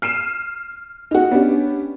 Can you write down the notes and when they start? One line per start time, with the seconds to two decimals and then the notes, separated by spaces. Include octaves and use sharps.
0.02 F6 C7 D#7 E7
1.11 D#4 F#4
1.31 B3 C#4 D4 G4